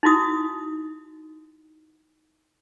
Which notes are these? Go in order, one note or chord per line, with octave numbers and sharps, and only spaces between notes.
D#4 E4 F#4 D#6